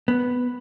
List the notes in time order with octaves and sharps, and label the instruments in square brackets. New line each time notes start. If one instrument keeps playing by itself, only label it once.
[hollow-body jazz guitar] B3